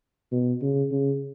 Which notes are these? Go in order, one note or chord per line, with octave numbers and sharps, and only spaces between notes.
B2
C#3
C#3